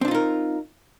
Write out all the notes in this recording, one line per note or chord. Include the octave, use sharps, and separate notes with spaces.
C4 D4 D#4 F4 A#4